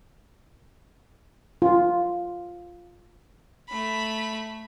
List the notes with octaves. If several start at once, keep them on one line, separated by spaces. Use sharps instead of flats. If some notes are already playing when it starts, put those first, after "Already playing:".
F4
A3 B5